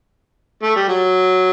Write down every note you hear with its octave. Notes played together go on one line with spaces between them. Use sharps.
A3
G3
F#3